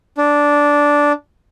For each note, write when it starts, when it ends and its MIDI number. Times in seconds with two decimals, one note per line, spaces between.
0.18 1.12 62